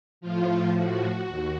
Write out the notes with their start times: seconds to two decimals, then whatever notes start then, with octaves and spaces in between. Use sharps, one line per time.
0.21 A2 F3 F4
0.74 F#4
1.27 D#2